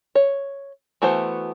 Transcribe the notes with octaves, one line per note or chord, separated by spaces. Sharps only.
C#5
E3 A3 B3 F#4 C5